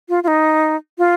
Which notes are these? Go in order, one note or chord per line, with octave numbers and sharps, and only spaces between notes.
F4
F4
D#4
F4